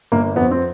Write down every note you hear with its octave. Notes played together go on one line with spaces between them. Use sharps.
G1 A#3
F2 B3
C4